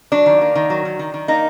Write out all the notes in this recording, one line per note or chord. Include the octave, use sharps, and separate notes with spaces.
F#3 D4
D#3
A#3
D#3
F#3
D#3
D#3
D#3
A#3 D#4